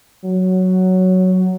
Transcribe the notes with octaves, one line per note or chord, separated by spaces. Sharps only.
F#3